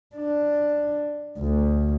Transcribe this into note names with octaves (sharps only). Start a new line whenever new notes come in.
D4
D2